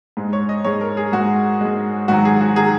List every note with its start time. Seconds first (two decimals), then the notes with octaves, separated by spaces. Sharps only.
0.17 G#2 G#3
0.33 C#5
0.49 D#5
0.64 G#2 G#3 C#5
0.81 A#4
0.97 G#4
1.12 G#2 G#3 F#4
1.61 G#2 G#3
2.08 G#2 D#3 F#3 F#4
2.25 G#4
2.41 F#4
2.56 D#3 F#3 G#4